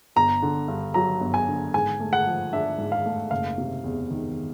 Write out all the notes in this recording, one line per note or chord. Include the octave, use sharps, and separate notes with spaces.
G1 A#5
D3
G2
F#3 A#5
G1
G#5
D3
G#2 G#5
A3
F#5
F3
D4 E5
G#2
F5
A3
F#1 F5
C3
E2
D#3